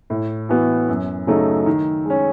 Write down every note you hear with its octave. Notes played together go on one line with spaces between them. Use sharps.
A2
E3 B3 F#4
F#2
C#3 F#3 A3 D#4
D#3
G#3 C#4